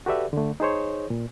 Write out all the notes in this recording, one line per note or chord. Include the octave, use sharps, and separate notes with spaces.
F#4 G4 A4 B4 D5 E5
D3 A3
D#4 G#4 C5 C#5
A#2